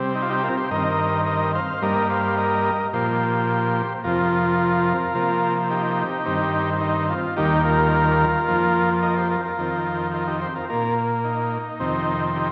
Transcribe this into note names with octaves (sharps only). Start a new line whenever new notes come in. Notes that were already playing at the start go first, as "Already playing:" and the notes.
Already playing: C3 G3 C4
D#4
F4
D#4 G4
F4 A#4
G4 C5
G2 D#3 C4 A#4 D#5
A#4 D#5
C5 F5
C5
G2 G3 A#3 A#4 D#5
C5 F5
A#4 D#5
A#2 F3 A#3 G4 C5
F2 C3 F3 F4 A#4
C3 F3 A#3
D#4 G4
G2 D#3 C4
D#4
F4
D#2 D#3 G3 A#3 D#4 G4
F4 A#4
F2 F3 A#3
A#4 D#5
G4 C5
F4 A#4
F4 A#4
F2 D#3 C4
F4 A#4
D#4 G4
G4 C5
F4 A#4
A#2 A#3 F4 A#4
D#4
F2 C3 D#3 C4
D#4 G4